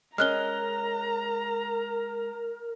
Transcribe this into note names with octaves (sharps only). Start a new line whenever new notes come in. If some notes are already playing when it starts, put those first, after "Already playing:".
G#3 C#4 A#4 A#5 F6 F#6 G7